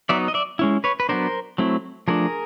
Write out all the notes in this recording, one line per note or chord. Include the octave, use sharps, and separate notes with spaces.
F#3 B3 D#4 D5 E5
D#5
D5 E5
G#3 C#4 E4
B4 C#5
B4
F#3 B3 D4 A#4 C5
F#3 A3 C4 E4
F3 A3 D4 G#4 A#4